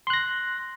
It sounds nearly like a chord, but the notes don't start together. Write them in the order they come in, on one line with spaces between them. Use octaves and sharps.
C6 F#6 A#6